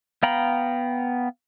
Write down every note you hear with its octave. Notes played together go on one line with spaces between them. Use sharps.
B3 F5 G5 A#5 B5